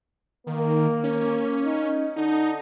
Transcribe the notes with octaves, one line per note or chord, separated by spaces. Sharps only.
D#3 A#3
C#4
D#4
D3 D#4